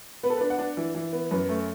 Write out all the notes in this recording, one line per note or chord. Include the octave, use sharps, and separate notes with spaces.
B3 B4
A4
B4
D4
F#5
D4
E3
E3
B3
F#2 B4
A3